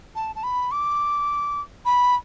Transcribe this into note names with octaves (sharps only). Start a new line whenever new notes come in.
A5
A5
B5
D6
B5